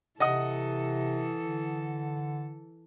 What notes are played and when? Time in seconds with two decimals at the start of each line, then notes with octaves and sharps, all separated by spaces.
0.20 C3 E3 A4 D#5 F#5 D#6
1.43 D3